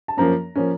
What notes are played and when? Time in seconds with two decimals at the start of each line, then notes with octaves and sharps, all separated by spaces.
0.08 A5
0.17 F#2 F3 A#3 C#4 A#5
0.56 F3 A#3 C#4